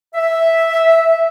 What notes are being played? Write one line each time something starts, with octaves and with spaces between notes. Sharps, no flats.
E5